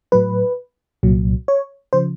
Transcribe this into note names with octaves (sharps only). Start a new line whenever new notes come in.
A2 F#3 B4
C2 A#2 F#3
C#5
C#3 F3 C5